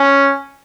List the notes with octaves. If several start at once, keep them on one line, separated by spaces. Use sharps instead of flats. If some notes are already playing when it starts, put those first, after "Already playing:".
Already playing: C#4